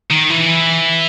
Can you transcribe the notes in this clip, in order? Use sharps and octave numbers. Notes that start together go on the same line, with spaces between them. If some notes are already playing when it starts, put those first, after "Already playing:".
D#3
E3